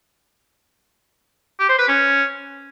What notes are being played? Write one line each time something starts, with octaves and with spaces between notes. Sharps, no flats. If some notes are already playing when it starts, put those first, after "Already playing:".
G4
C5
B4
C#4